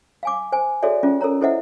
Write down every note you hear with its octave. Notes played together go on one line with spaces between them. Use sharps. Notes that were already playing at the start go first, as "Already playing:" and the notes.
F5 G#5 D6
C5 G#5
F#4 G#4 A4 C#5 D5 E5
C#4 F4 G#4
A4 A#4 C#5 A#5
E4 A4 C5 D#5 E5 F#5